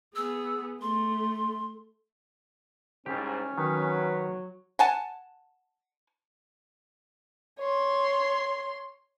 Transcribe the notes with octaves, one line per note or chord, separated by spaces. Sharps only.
B3 G#4 E6
A3 C6
C2 G#2 C#4 G4
D#3 F#3 B4
F#5 G#5 A5
C#5 C6